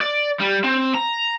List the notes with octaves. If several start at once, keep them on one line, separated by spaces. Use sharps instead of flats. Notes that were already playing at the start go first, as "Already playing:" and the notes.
D5
G3
C4
A#5